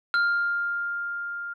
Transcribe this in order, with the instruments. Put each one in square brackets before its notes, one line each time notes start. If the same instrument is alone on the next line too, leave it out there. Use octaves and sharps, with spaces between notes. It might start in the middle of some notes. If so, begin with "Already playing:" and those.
[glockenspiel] F6